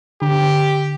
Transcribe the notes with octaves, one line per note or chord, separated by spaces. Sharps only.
D3 G4